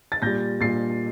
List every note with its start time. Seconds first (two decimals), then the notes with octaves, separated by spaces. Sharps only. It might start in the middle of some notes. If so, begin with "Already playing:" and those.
0.12 A6
0.22 A#2 G3 G6 A#6
0.61 A#2 G3 A6 C7